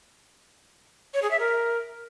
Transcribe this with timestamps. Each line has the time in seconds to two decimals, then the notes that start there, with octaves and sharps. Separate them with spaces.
1.14 C#5
1.22 G#4
1.31 E5
1.39 A#4